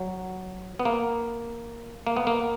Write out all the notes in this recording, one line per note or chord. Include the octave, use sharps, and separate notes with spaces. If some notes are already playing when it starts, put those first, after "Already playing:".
Already playing: F#3
B3
A#3
A#3
B3
A#3